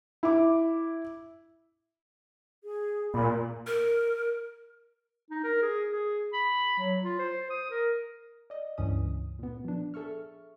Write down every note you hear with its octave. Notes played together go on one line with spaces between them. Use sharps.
E4 D6
G#4
A#2 B5
A#4
D#4
A#4
G#4
G#4
B5
F#3
F4
C5
D#6
A#4
D5 D#5
C#2 G2 E3 C#4 D#6
A#2 B3
F3 D4
G#4 A4 E5 C#6 F6